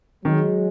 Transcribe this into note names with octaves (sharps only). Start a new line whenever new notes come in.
D#3 F#3 G#3